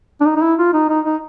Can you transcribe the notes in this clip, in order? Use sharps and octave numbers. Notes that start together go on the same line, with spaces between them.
D4
D#4
D#4
E4
F4
D#4
D#4
D#4